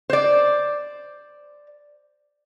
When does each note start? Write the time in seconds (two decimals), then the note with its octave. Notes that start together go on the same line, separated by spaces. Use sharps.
0.10 C5 D5